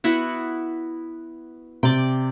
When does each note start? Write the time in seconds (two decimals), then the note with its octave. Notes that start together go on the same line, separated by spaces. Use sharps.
0.04 B3 E4 F#4
1.83 C3 D5 G5